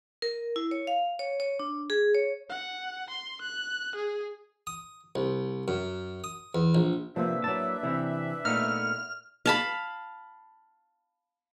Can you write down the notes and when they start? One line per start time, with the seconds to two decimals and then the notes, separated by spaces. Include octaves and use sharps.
0.22 A#4
0.56 E4
0.71 C#5
0.87 F5
1.19 C#5
1.40 C#5
1.59 D4
1.90 G#4
2.14 C#5
2.49 F#5
3.10 C6
3.41 F#6
3.95 G#4
4.67 D#6
5.15 C2
5.68 F#2
6.24 D#6
6.55 E2
6.75 A#1
7.16 C3 F3 A#3 C4 D4 B4 E5
7.44 F#3 A#3 E4 A5
7.83 C3 E3 C4 E4
8.45 A#2 A3 B3 D#4 F6
9.46 F5 A5 B5